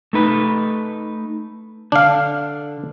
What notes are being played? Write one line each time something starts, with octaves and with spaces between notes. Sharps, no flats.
A3 D#4 B4
D3 D4 F5